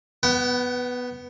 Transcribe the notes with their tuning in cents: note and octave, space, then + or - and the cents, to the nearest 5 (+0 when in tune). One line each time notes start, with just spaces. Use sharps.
B3 +0 F#5 +40